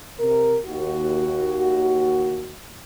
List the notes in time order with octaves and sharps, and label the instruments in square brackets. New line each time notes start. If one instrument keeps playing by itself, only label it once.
[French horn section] C3 A#4
D#2 F#4